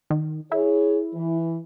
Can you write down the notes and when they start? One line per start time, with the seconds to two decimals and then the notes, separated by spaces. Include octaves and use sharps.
0.10 D#3
0.52 E4 G#4 C#5
1.14 E3